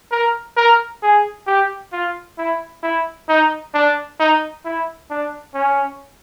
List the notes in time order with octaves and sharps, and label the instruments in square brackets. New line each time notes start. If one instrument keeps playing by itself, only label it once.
[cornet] A#4
A#4
G#4
G4
F4
E4
E4
D#4
D4
D#4
E4
D4
C#4